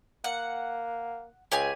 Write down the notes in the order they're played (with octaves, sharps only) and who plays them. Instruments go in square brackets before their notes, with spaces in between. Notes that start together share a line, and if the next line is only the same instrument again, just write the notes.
[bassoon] A#3 [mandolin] F#5
[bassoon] C#2 [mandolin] G4 G#4 G#5